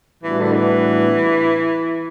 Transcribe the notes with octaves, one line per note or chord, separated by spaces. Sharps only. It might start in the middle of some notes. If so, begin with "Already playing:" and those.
A2 E3 G3 B3 D4 F#4
D3
E3